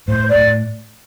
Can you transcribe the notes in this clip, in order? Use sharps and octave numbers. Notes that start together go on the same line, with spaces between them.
A2 C5
D5
A2